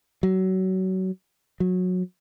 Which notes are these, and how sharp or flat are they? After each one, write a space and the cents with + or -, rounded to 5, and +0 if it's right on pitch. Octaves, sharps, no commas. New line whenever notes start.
F#3 +25
F#3 -20